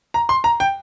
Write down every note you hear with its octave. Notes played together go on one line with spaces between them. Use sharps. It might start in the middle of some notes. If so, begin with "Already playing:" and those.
A#5
C6
A#5
G5